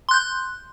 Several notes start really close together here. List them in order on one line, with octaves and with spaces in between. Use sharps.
C6 F#6 G6